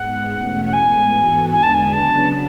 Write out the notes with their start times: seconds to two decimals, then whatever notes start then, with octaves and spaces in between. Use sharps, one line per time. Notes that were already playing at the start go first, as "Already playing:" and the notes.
Already playing: G#2 G#3 B3 F#5
0.32 E2 B2 A3 C#4
0.65 F#5
0.73 A2 G#3 B3 G#5
1.13 G#2 E3 B3 F#4 A4
1.52 E2 D3 G#3 B3 D4 G#5
1.63 A5
1.74 G#5
1.93 C#3 F#3 B3 D4 A5